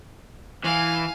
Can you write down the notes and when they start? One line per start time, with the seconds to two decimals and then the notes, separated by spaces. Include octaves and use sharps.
0.64 E3 F5 G#5